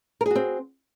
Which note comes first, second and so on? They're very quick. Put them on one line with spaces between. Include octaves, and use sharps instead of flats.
A#4 G#4 F#4 C4